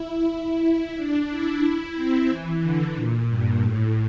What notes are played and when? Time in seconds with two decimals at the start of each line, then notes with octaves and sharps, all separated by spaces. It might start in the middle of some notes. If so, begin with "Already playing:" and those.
Already playing: E4
0.30 E4
0.63 E4
0.96 D4
1.29 E4
1.62 E4
1.96 C4
2.28 E3
2.62 D3
2.95 A#2
3.29 G2
3.61 A2